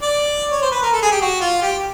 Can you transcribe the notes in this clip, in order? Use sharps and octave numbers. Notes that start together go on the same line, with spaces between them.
D5
C#5
C5
B4
A#4
A4
G#4
G4
F#4
F4
G4